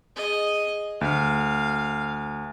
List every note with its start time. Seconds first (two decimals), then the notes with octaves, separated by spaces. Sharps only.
0.16 G#4 D#5
1.01 D2 F5